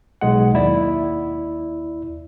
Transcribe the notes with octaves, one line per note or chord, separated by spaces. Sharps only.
B1 G#3 F#5
D#2 E4 D5